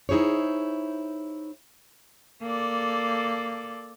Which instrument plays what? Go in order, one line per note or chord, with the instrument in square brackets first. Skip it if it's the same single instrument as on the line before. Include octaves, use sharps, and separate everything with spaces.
[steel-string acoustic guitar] D#4 E4 G#4 C5 C#5
[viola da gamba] A#3 A4 D5